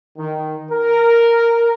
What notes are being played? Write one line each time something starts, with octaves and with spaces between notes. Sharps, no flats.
D#3
A#4